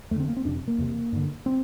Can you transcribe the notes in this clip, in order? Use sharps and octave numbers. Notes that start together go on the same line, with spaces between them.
E2 D3 A3 C4
A#3
C4
F2 C3 D4
A#3
E2 C3
G2 D3
C4